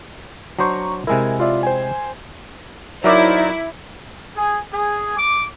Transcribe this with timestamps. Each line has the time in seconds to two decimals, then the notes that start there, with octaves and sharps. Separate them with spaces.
0.59 F#3 D4 C5 A#5 C#6
1.07 C3 G#3 E4 A#4 G#5
1.40 F4 D5 E5
1.63 C5 G5 G#5
3.04 F#3 D#4 E4 A#4 C5 D5 D6
4.35 G#4
4.71 G#4
5.17 D6